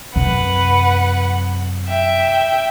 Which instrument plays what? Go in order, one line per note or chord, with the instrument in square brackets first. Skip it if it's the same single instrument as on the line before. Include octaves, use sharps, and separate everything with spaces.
[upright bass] F#2 C3 [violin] B4 F#5
[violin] E5 G5